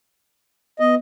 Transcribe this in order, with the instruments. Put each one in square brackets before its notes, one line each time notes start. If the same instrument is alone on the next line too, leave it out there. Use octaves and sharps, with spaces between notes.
[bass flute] B3 [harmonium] D#5